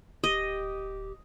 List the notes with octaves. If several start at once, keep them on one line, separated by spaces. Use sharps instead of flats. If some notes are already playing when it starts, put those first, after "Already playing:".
D1 G4 D#5